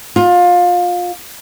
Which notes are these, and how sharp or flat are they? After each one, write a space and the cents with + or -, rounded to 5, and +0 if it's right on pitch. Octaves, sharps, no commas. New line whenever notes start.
F4 +25